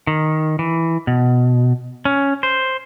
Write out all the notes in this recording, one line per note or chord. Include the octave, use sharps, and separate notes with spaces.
D#3
E3
B2
C#4
C5